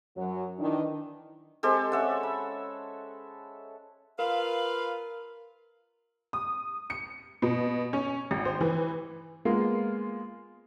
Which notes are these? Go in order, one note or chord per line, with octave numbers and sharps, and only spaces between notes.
F#2 F#3 F#4
D#3 E3 D4
G#3 C4 G4 A4
C#4 E5 F#5
B5
F4 A#4 B4 F5
D#6
C#7
B2
C#4
G#1
C5
E3
G#3 A#3 B3 F4